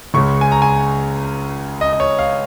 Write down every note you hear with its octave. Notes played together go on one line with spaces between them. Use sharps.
C#2 C#3 G#3 C#6
G#5
A#5
G#5
D#5
D#5
C#5
F5